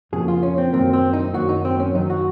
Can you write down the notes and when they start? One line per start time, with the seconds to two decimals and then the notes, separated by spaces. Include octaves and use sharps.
0.13 F2 C#3 F3 A#3 G#4
0.28 F4
0.43 C#4
0.58 C4
0.73 F#2 D#3 A#3 C4
0.93 C4
1.13 D#4
1.34 F#2 D#3 F#3 A#3 F#4
1.49 D#4
1.65 C4
1.80 C#4
1.95 F#2 D#3 F#3 D#4
2.10 F#4